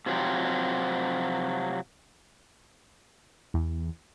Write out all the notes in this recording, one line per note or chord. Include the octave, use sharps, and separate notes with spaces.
C3 F3 F#3 C4
E2